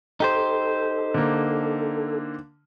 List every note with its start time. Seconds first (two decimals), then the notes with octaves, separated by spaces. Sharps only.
0.20 D#4 G4 A4 C5
1.14 D3 A#3